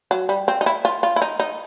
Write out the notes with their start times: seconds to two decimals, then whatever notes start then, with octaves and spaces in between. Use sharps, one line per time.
0.11 F#3
0.29 G3
0.48 C4
0.61 D#4
0.66 E4
0.85 F4
1.03 F4
1.16 E4
1.22 D#4
1.40 D#4